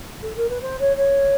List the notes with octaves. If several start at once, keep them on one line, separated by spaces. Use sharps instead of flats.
A4
A#4
B4
C5
C#5
C#5